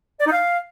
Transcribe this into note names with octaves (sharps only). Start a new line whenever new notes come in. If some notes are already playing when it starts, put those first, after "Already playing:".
D5
D#4
F5